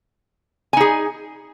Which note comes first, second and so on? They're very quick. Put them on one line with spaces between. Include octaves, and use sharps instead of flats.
G#5 D#4 G#4